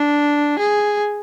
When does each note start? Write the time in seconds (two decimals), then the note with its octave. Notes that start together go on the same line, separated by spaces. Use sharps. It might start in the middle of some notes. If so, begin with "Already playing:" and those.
Already playing: D4
0.59 G#4